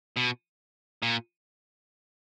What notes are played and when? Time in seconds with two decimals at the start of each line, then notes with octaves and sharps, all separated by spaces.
0.17 B2
1.03 A#2